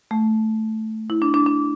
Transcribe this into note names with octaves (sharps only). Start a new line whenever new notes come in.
A3
E4
D4
D4
D4